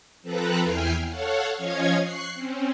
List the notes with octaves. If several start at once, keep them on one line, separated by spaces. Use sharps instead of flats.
F3 C4 A4 B4 A#5 F#6
E2 E4 G5 G#5 F6 C7
A4 C#5 F5 F#5
F3 C#4 C#5 D#5 F5 G#6
C#6 F#6 C7
C4 C#4